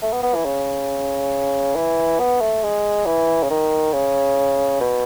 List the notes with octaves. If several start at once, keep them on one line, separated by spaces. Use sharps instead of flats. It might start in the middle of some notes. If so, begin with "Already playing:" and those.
A3
B3
B3
E3
C#3
E3
B3
A3
G#3
E3
C#3
D#3
C#3
B2